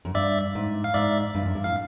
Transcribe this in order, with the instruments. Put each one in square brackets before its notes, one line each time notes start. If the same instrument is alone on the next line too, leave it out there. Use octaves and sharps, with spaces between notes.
[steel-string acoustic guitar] F#2
[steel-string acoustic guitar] G2 [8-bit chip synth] D5 E5
[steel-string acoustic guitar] G#2
[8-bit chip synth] F5
[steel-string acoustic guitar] G#2 [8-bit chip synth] D5 E5
[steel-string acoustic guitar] G2
F#2
G2
[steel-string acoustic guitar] A2 [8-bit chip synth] F5